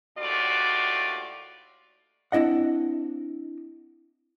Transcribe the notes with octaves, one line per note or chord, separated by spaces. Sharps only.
D#2 A2 F4 F#4 D5
C4 D4 E4 D#5 F#5